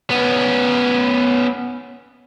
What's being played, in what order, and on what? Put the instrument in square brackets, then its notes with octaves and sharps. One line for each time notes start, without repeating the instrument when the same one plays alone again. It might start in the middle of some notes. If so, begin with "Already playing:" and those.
[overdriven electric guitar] B3 C#4